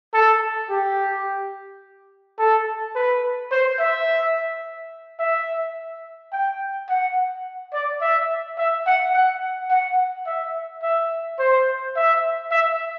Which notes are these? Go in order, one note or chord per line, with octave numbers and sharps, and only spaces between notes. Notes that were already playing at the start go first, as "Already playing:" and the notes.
A4
G4
A4
B4
C5
E5
E5
G5
F#5
D5
E5
E5
F#5
F#5
F#5
E5
E5
C5
E5
E5